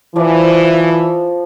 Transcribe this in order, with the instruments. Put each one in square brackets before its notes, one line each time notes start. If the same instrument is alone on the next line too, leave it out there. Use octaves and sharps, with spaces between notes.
[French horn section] E3 [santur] F3 D5